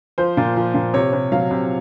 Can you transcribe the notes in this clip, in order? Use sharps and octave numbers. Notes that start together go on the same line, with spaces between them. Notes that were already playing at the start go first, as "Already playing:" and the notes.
F3 C5
A#2
F3
A#2
C3 C#5
C3
F#3 F5
C3